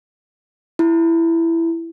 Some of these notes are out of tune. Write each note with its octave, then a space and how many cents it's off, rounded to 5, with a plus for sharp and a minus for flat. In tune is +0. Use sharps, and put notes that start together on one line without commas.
E4 +10